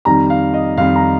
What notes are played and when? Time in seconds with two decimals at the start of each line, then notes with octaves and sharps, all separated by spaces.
0.05 F2 D#3 G3 A#5
0.30 F5
0.54 D#5
0.77 F2 D#3 G3 F5
0.95 A#5